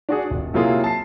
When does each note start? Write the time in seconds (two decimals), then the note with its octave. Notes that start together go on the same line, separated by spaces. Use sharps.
0.09 D4 F#4 G#4
0.30 D#1
0.54 C3 F#3 A#3 E4 F4 G#4
0.84 A5 C7